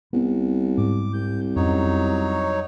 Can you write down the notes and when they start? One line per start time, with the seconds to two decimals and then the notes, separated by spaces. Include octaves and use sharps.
0.13 C2 B3
0.78 G#2 D6
1.13 C2 G6
1.56 F2 F#3 C#4 D#4 C#5